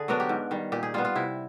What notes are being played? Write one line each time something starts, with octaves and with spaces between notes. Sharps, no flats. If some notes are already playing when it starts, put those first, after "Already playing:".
Already playing: D3 G#4
F#3 B3 D4 A#4
G4
G#2
D#3 G3
A#2 G4
G#4
G3 B3 F4
F4
C3 E4